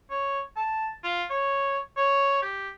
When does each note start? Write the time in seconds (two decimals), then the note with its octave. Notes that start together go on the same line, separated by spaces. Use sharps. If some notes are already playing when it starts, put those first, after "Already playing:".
0.10 C#5
0.56 A5
1.04 F4
1.30 C#5
1.97 C#5
2.42 G4